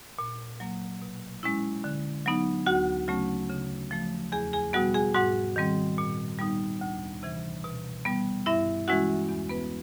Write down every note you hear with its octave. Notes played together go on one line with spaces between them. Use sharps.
A#2
F#3 A#3
B2
G#3 C#4 E4
D3
F#3 B3 D#4
D2 F#4 F#5
C#3 F#3 A3 C#4
C#3
F3 A3
E2 G#4 G#5
G#4 G#5
B2 G3 B3 F#4 F#5
G#4 G#5
G#2 F#4 F#5
D#3 G3 C4
A#2
G3 B3 D#4
D2
C3 E3
B2
G3 B3
G2 E4 E5
E3 G#3 C#4 E4 F#4 F#5
E2
B3 B4